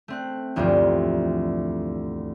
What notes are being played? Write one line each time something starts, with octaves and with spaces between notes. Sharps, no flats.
A3 C4 F#6
E1 D2 G2 F3 F4